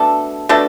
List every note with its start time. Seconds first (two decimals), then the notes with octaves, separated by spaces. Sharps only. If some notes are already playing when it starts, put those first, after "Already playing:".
Already playing: B2 A3 D4 A4
0.49 B2 A3 D4 A4